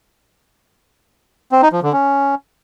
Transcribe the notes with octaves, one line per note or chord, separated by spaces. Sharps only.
C4
D#4
F3
D3
C#4